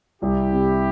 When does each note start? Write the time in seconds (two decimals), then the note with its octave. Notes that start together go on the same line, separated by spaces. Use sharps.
0.22 C2 E4 G4
0.52 C3